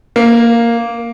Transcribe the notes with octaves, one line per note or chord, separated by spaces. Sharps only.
A#3